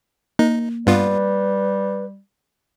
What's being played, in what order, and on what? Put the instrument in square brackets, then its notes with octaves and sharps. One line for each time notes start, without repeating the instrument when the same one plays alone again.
[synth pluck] A#3 [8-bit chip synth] D#4
[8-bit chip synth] G2 B3 F4 [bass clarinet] G3 [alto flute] B4